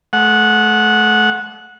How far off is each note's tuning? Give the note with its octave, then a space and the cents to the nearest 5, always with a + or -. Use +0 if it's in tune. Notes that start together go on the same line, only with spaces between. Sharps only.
A3 -35 F#5 -10